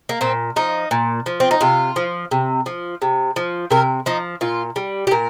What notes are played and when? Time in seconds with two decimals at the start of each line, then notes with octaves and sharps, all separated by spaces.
0.09 A#3
0.21 A#2 C4
0.56 F3 D#4
0.91 A#2
1.26 F3
1.40 C4
1.51 D#4
1.61 C3 F4
1.96 F3
2.31 C3
2.66 F3
3.02 C3
3.36 F3
3.71 C3 A#4
4.06 F3 D#4
4.41 A#2 F4
4.76 G3
5.07 G4
5.11 A#2 A#4